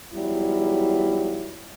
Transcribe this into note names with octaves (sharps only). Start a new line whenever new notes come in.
E2 G#2 F#3 G3 E4